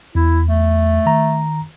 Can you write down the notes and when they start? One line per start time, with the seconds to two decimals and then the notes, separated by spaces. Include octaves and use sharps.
0.15 E2 E4
0.48 A3
1.06 D#3 A#5